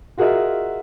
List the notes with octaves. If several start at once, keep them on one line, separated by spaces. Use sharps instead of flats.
F4 F#4 G#4 A#4 D#5 E5